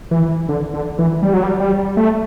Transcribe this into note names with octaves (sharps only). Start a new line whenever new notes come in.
E3
D3
D3
E3
G3
F#3
G3
G3
A3